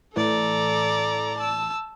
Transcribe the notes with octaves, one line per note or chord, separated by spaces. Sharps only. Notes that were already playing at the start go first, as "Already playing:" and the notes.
A2 E3 A4 D5 A#5
A5 E6